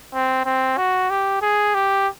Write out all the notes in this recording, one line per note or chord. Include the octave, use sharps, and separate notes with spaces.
C4
C4
F#4
G4
G#4
G4